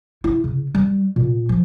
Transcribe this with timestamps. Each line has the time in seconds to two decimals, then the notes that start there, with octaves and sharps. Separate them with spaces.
0.24 E4
0.44 C#3
0.75 G3
1.16 A#2
1.49 F3